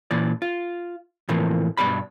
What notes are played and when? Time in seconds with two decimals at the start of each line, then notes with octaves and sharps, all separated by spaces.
0.11 A#2 E3 D5
0.42 F4
1.29 A2 C3 E3 F3 A3 A#3
1.77 G2 B2 D5 B5